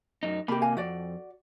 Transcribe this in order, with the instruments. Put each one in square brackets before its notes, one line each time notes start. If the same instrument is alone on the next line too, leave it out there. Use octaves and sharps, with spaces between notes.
[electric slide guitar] F#2 D#4
[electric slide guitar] C3 A#3 [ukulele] G4 B5
[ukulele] F5 G#5
[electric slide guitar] F2 [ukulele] F#4 D5